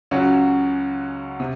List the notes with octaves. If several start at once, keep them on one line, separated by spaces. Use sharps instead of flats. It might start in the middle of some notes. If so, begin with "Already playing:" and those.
C#2 C#3 F#3 C#4 F#4
C3